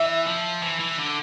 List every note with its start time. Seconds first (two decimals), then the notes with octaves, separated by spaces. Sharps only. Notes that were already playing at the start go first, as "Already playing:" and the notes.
Already playing: E3 E5
0.27 F3
0.62 E3
0.80 E3
0.99 D3